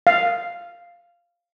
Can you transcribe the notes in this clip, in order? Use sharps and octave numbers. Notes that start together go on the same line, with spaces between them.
F5